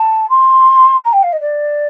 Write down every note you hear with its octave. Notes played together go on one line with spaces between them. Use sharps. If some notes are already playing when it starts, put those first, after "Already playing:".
Already playing: A5
C6
A#5
G5
F5
D#5
D5